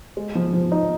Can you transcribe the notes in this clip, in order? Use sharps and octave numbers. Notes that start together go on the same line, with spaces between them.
G#3
F3
F3
D#4